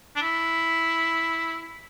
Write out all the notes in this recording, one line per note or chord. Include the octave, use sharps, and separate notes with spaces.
D4
E4